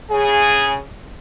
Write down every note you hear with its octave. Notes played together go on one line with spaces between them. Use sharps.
C#3 G#4